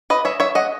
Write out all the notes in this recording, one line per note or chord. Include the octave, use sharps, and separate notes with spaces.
B4 D#5
C#5 E5
C#5 E5
D#5 F#5